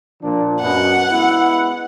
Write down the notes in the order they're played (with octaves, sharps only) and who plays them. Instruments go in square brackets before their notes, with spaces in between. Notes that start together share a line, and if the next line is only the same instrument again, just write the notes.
[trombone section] A#2 F3 D4
[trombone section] F#2 B2 [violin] F#5
[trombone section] G#3 B3 E4